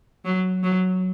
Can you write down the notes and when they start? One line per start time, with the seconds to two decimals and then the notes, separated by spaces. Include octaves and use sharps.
0.25 F#3
0.63 F#3